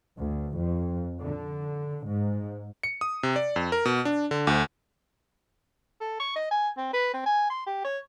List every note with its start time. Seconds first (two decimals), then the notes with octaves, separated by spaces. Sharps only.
0.16 D2
0.56 F2
1.22 D3
2.06 G#2
2.83 C#7
3.01 D#6
3.23 C3
3.36 D5
3.56 F2
3.72 A#4
3.85 B2
4.05 D4
4.31 D3
4.47 D2
6.01 A4
6.20 C#6
6.35 D#5
6.51 G#5
6.77 C4
6.93 B4
7.13 C4
7.26 G#5
7.50 C6
7.67 G4
7.84 C#5